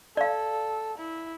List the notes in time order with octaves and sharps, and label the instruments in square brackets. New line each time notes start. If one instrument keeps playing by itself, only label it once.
[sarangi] A4 [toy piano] D5 F5
[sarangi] E4